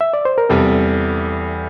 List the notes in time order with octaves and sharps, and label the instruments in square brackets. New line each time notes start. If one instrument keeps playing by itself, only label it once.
[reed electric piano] E5
D5
C5
A#4
[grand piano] E2 C3 G3 [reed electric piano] A4